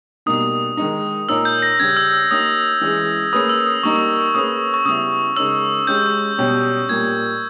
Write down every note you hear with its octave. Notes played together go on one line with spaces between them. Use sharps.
B2 G3 A#3 D#4 D#6
D#3 G#3 D#4
A#2 A#3 D#4 A#4 C#5 E6
G6
A#6
C#3 G3 C#4 G#6
E6
E6
A#3 D#4 G4 C#5 D#6
E3 G#3 C#4 G#4 C#5
A#3 C#4 G#4 B4 D#6
E6
D#6
G3 A#3 D#4 A#4 C#6
A#3 C#4 G#4 B4 D#6
C#6
C#3 G3 B3 E4 D#6
C#3 G#3 D#4 A#4 C#5 E6
G#3 C#4 G4 G6
B2 G3 C#4 G4 C#5
A#2 G3 A#3 G#6